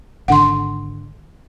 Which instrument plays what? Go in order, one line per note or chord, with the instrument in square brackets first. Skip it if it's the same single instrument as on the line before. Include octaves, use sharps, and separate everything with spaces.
[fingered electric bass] G#1 D3 [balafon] F#5 C6